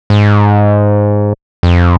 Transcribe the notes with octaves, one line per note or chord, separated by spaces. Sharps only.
G#2
F2